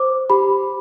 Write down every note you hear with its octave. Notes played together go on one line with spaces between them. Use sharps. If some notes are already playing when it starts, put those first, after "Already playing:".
Already playing: C5 D6
G4 B5